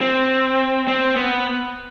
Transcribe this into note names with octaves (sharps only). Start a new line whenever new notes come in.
C4
C4
B3